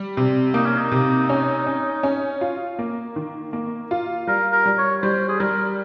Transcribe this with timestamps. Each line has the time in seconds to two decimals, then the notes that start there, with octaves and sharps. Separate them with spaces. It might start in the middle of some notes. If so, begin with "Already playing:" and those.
Already playing: G3
0.17 C3
0.54 A#3 D#4
0.66 C#4
0.78 D#4
0.91 C3
1.30 C#4
1.66 C#4
2.03 C#4
2.41 F4
2.79 A#3
3.16 D#3
3.53 A#3
3.91 F4
4.27 G3 A#4
4.52 A#4
4.66 G3
4.78 C#5
5.03 G3 C5
5.29 G#4
5.40 G3 A#4